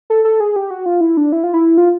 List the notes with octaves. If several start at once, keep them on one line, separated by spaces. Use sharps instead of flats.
A4
A4
G#4
G4
F#4
F4
E4
D4
E4
F4
E4
F4